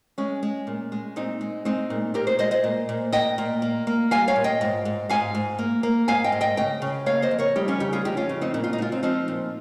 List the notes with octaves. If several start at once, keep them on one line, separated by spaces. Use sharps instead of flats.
G#3 C#4
G#3
A#2
G#3
A#2 C4 D#4
G#3
G#3 C4 D#4
A#2
A#2 G4 A#4
G#4 C5
G#3 C5 D#5
C5 D#5
A#2
A#2
A#2 D#5 G5
A#2
A#3
A#3
G3 F5 G#5
C#5 F5
A#2
D#5 G5
G#2
G#2
G#2 F5 G#5
G#2
A#3
A#3
G#2 F5 G#5
D#5 G5
G#2
D#5 G5
C#3 D#5 G5
C#3
A#3 C#5 F5
C5 D#5
F2
A#4 C#5
G3 D#4 G4
C#4 F4
C#3 D#4 G4
F4 G#4
F2 D#4 G4
C#4 F4
C#3
C4 D#4
A#2 D#4
F4
D#4
G#3 F4
C4 D#4
F3 C4 D#4
A#2